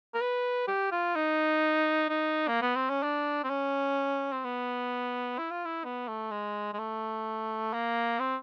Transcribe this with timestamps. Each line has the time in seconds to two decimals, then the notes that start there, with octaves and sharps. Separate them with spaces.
0.14 A#4
0.21 B4
0.68 G4
0.92 F4
1.16 D#4
2.09 D#4
2.48 A#3
2.62 B3
2.76 C4
2.90 C#4
3.03 D4
3.44 C4
3.50 C#4
4.32 C4
4.45 B3
5.38 E4
5.51 F4
5.65 E4
5.84 B3
6.08 A3
6.32 G#3
6.73 G#3
6.79 A3
7.73 A#3
8.20 C4